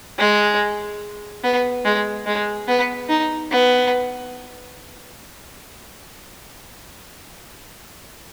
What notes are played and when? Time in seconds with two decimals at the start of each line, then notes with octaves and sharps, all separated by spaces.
0.19 G#3
1.43 B3
1.85 G#3
2.26 G#3
2.68 B3
3.09 D#4
3.51 B3